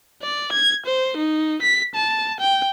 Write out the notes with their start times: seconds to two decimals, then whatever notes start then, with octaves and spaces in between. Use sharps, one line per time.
0.22 D5
0.52 G#6
0.86 C5
1.17 D#4
1.62 B6
1.95 A5
2.40 G5